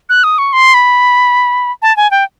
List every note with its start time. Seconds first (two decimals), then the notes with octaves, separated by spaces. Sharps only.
0.09 F#6
0.24 D#6
0.38 C#6
0.53 C6
0.74 B5
1.82 A5
1.97 G#5
2.11 G5